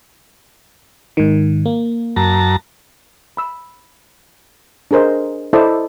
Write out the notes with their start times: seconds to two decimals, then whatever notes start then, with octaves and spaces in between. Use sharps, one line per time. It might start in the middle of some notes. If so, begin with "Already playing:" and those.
1.17 G#2 D#3
1.66 A#3
2.16 F#2 A5 A#5
3.37 B5 E6
4.91 D4 G#4 A#4 C5 D#5
5.53 E4 A4 C5 D5 D#5 A5